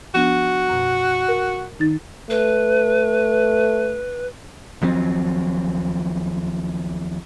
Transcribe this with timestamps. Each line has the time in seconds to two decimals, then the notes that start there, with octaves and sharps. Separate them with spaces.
0.15 F3 B3 D4 F#4
0.69 F#2 B2
1.29 A#4
1.79 D#3 D#4 A6
2.30 A3 B4
4.82 D#2 F3 F#3 C4